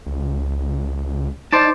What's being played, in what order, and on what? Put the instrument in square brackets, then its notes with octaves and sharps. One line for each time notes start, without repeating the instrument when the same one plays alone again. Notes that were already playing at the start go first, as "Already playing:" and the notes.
[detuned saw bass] C#2
[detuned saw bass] D#4 [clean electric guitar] C5 D5 A5